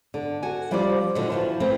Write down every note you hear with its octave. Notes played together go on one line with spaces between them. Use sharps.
D3
F#4 G#5
F3 G3 C#4 F4 C5 D5
A#2 D3 D#3 F#3
E3 F3 F#4
E3 A3 C4 C#4 E4 F4